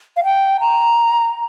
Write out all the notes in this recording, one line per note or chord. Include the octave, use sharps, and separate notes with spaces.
F5
G5
A#5